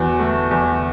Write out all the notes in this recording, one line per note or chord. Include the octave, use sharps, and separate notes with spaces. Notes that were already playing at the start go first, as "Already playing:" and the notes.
Already playing: E2 E3 F#4
A3
E2